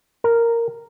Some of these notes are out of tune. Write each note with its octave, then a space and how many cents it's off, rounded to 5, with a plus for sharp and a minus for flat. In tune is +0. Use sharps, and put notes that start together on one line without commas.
A#4 -5